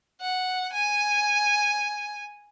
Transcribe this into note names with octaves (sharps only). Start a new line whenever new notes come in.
F#5
G#5